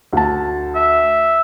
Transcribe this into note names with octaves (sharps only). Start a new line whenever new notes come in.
D2 A5
E5